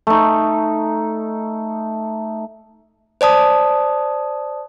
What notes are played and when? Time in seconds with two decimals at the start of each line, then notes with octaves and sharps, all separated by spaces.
0.07 A3 D#4
3.21 C5 D5 A5 D#6